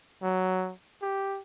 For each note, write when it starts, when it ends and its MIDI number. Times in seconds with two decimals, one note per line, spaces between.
0.23 0.73 54
1.02 1.40 67